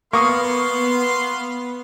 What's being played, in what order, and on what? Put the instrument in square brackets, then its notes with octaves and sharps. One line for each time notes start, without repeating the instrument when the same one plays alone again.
[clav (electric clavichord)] A#3 [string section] B3 [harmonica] F5 C6 [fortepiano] C#6 D#6